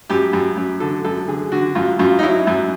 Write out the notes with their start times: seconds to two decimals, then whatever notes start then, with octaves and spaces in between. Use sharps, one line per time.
0.10 F#2 G4
0.33 F#2
0.57 F#2
0.80 D3 A4
1.04 F#2 A4
1.28 D3 G#4
1.52 D3 F#4
1.75 F#2 F4
1.99 F#2 F4
2.19 D#4
2.23 F#3 E4
2.47 F#2